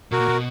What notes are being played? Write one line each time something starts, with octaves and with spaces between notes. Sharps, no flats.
B2 F#4 A#4
A#2
B2